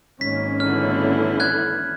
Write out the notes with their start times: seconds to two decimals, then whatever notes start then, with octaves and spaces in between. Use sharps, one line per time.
0.21 G#1 A#3 C#4 B6
0.60 D3 E3 E4 F6
1.40 F#6 G#6